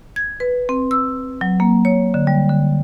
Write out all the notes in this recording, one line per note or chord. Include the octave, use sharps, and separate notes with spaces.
G#6
B4
C4
E6
F#3
A#3
C#5
D3
G3
D3